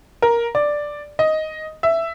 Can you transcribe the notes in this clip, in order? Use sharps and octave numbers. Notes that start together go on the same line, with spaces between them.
A#4
D5
D#5
E5